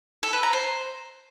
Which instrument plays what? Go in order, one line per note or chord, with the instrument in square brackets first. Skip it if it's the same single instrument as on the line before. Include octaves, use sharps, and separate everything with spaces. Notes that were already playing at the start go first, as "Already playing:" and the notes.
[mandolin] A4
B4
A#5
C5